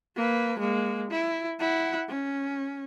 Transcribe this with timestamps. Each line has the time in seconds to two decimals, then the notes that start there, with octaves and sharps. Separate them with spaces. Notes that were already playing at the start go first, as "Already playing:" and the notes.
0.16 A#3 B4
0.59 G#3 A#3
1.11 E4
1.59 E4 F#5
2.08 C#4